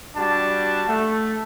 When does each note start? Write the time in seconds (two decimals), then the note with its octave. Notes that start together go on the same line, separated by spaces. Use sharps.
0.16 G3 D4 F#4 A5
0.88 A3